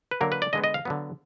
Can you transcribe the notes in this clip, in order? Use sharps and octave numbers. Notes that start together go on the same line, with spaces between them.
B4
D3 F#3 A#3 A#4
B4
D5
D3 G#3 B3 D#5
D#5
F5
D3 F#3 B3